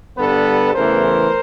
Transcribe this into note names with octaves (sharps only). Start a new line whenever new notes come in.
G2 D3 G3 B3 A4 B4
E2 C#3 E3 A3 A#4 C5